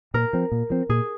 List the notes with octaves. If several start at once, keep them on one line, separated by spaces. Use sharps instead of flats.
A#2 A#4
F3 C4
A#2
F3 C4
A#2 G#4